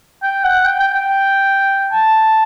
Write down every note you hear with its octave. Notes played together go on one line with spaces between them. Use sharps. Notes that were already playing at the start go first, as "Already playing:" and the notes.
G5
F#5
G5
G5
G5
A5